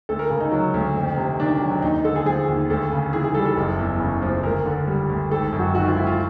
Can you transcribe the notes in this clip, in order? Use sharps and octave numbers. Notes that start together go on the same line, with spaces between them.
D2 A4
A#4
C#3
D#4
F#3
D2
F2
C3
D#3 D4
F#3
D#2 D#4
D#4
D3 A4
G#4
F3 G#4
D#2
D2 A4
C#3
E3 G#4
G#4
G3 A4
A4
F#1
E2
C#3
F3
D2 A#4
D3
G3
D2
G#1 A4
F#2
F#4
D#3 F#4
F4
G#1 E4
F4